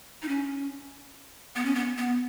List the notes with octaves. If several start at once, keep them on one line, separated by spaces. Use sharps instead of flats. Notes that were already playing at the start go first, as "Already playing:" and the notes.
D#4
C#4
B3
C#4
B3
B3